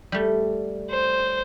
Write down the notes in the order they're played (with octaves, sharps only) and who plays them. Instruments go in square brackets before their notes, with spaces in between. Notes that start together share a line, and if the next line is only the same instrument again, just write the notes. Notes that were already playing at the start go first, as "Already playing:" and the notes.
[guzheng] G3 A3
[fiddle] C5